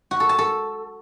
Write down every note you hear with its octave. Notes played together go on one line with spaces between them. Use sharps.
F#4
A4
A5
A4